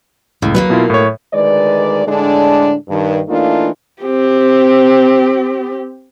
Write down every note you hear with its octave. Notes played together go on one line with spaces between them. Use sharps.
C#2 A2
F#3 G3 A#3 B4
B2 E4 F4
A2 C#5
D2 D#3 G#3 B4 D5
A2 D3 G#3 D4
G2 D#3
E3 A3 A#3 D4 D#4 F4
C4 G4